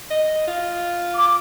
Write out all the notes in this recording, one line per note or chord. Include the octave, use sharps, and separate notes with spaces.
D#5
F4
D6